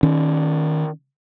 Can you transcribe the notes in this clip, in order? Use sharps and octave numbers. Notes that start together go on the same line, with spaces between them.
D#3 C#4